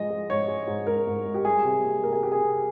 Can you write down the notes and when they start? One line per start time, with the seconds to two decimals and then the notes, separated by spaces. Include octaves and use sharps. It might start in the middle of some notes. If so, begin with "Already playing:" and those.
Already playing: G#2 F3 G#3 D#5
0.10 G#3
0.29 G#2 C#5
0.48 G#3
0.67 G#2
0.87 G#2 A#4
1.07 G#2
1.26 G#2
1.34 G4
1.45 G3 G#4
1.64 C3
1.85 A#3
2.03 A#3 A#4
2.13 G#4
2.23 C3 G4
2.32 G#4
2.42 C3